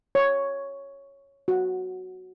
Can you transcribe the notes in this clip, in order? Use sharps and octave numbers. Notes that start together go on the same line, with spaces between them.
C#5
F#4